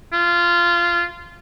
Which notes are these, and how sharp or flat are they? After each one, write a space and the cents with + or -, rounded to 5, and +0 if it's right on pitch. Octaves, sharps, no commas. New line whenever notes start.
F4 -15